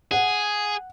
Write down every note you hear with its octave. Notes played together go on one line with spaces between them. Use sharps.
G#4 F#5